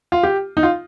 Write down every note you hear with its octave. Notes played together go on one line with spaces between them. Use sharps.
F4
G4
D#4
F4